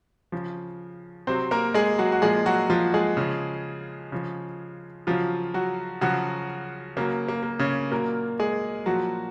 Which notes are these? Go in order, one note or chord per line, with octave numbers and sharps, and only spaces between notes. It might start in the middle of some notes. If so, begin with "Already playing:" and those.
C#3 F3
C3 F#3 C4 C5
A#3 A#4
G#3 G#4
F#3 F#4
F#4
A#2 F3 G#3 G#4
F#3 F#4
F3 F4
G#3 G#4
C#3 F3
C#3 F3
C#3 F3 F#3 F4
F#3 F#4
C#3 F3 F#3 F#4
C#3 F#3 A#3
A#3
A#3
C#3 C#4
A#2 F#3 A#3 A#4
G#3 G#4
A#2 F3 F#3 F#4